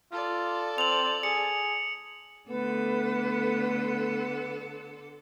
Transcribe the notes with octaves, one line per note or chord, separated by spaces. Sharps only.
F4 A4 D5
C4 F7 F#7
G#4 C#7
D3 A3 B3 A4 B4